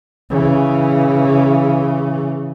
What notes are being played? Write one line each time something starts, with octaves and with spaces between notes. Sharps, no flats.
C#3 E3